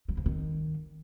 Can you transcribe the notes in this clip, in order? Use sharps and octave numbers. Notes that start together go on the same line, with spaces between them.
F#3
F3
D#3